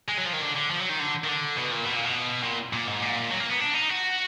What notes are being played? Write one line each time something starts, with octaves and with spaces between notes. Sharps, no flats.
G#3
F#3
F3
D#3
D3
D3
F3
F#3
D#3
D3
D#3
D3
B2
A#2
B2
A#2
B2
A#2
A#2
G#2
A#2
F#3
A#3
B3
D4
D#4
F#4